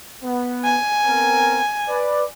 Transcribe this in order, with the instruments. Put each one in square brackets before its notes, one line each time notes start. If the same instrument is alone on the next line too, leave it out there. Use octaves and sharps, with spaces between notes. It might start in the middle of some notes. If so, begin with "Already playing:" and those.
[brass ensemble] B3
[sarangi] G#5
[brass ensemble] B3 C4 A#4
B4 D5